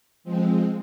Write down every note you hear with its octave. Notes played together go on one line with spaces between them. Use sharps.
F3 G#3 C4